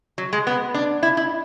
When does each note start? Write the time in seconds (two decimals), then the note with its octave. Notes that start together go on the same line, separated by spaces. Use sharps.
0.18 F#3
0.33 G#3
0.47 B3
0.74 D4
1.03 E4
1.17 E4